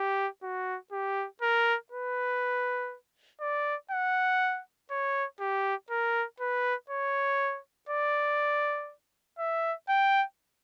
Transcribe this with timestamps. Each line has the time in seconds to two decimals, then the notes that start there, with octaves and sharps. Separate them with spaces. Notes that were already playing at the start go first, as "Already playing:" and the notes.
Already playing: G4
0.43 F#4
0.92 G4
1.42 A#4
1.92 B4
3.41 D5
3.91 F#5
4.90 C#5
5.40 G4
5.90 A#4
6.40 B4
6.90 C#5
7.89 D5
9.39 E5
9.89 G5